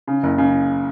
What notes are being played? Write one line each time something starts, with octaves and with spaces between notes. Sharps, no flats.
C#3
F#1
C#3